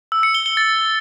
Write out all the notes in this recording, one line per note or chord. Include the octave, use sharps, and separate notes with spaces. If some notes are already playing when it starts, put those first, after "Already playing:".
E6
C#7
G7
G7
A6